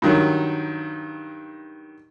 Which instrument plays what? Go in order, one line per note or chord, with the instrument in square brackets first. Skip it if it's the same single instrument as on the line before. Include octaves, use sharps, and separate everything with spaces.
[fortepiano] G2 D#3 F#3